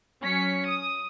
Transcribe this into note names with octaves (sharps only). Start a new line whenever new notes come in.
F#3 C#4 B6 C#7
D#6